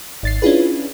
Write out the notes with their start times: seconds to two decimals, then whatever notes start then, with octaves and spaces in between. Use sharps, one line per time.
0.23 G#1 A6 C7
0.42 C#4 D4 E4 F4 G#4 B4